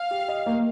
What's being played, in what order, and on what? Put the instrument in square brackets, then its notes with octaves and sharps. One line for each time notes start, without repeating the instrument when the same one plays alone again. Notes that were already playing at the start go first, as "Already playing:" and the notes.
Already playing: [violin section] F5
[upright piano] G4
D#5
A#3